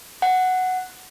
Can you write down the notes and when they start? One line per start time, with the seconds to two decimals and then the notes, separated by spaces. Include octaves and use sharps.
0.22 F#5